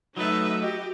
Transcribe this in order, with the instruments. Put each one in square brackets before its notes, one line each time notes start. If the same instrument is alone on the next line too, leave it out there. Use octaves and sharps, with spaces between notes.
[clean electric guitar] F#3 A3 [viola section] D#4 D#5 E5 [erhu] B4
[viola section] F#4 [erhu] G4 [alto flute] D#5